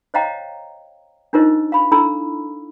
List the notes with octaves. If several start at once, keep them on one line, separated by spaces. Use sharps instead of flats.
C5 C#5 D#5 F5 G5 A#5
D4 D#4 F4 A#4 C5 D#5
F5 B5
D4 E4 A4 A#5 B5 E6